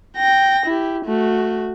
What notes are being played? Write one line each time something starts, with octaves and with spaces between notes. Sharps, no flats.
G5 A#6
E4 G4
A3 F#4